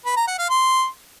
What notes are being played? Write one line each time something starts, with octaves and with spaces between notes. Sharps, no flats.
B4
A#5
F#5
F5
C6